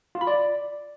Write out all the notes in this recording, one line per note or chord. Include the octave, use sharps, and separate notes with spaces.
F4
B5
D5